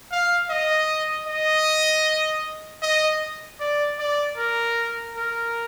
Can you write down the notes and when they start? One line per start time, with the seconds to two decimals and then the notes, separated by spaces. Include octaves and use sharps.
0.12 F5
0.50 D#5
1.27 D#5
2.82 D#5
3.60 D5
3.99 D5
4.37 A#4
5.15 A#4